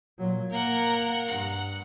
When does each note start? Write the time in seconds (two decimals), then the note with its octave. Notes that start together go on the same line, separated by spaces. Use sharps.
0.19 A#2 F#3
0.52 A#3 A#4 F#5
1.28 G2 F#5